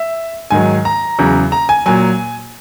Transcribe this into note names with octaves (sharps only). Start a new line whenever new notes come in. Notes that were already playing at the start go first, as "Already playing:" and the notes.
Already playing: E5
G#2 D#3 F#3 G#5
A#5
E2 C#3 F#3
A#5
G#5
A#2 F#3 G#5